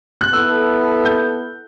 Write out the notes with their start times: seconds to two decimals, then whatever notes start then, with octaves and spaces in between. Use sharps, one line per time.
0.21 F#6
0.32 B3 E4 A4 E6
1.05 G6